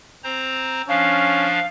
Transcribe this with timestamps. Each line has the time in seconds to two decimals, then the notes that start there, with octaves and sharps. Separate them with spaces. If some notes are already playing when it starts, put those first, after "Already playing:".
0.24 C4 C5 A#5
0.89 F3 C#4 D4 F5